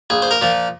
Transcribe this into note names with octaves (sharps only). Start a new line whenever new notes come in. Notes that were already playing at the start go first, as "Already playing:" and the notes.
A#1 G#4
C5
A#4
A#2 F3